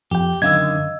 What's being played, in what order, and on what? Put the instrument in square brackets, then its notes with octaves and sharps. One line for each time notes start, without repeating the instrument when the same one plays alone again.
[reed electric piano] F2 G5 [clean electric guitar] G4
[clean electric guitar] F#2 D3 D#3 [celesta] D#5 F5 E6 [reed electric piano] G#6